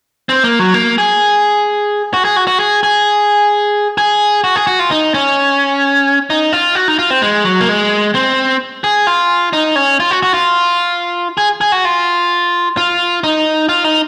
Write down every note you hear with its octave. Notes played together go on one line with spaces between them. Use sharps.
C4
A#3
F#3
A#3
G#4
F#4
G#4
F#4
F#4
G#4
G#4
G#4
F#4
G#4
F#4
F4
D#4
C#4
D#4
F4
F#4
D#4
F4
C4
G#3
F#3
A#3
G#3
C4
G#4
F4
D#4
C#4
F4
F#4
F#4
F4
G#4
G#4
F#4
F4
F4
D#4
F4
D#4